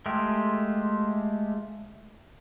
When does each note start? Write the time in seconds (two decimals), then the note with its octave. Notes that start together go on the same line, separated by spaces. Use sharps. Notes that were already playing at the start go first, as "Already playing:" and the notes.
0.06 G#3 A3 F4 G4